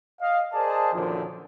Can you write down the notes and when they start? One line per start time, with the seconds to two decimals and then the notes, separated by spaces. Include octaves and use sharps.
0.22 D#5 F5
0.53 G#4 A#4 C5 D5 D#5 A5
0.94 F#2 A#2 D3 D#3 F3